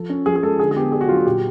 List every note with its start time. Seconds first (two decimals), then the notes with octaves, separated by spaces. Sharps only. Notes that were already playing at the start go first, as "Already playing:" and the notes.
Already playing: F3 A4
0.10 C#4
0.26 F3 G#4
0.36 G#4
0.43 G#3 A4
0.59 D3 G#4
0.71 G#4
0.76 B3 G4
0.92 D4 G#4
1.01 F#4
1.09 F#3 F4
1.17 F#4
1.26 A#2 G4